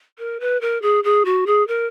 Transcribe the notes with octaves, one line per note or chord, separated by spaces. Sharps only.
A#4
B4
A#4
G#4
G#4
F#4
G#4
A#4